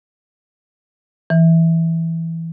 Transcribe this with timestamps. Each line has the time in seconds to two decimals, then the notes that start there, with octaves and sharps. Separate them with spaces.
1.30 E3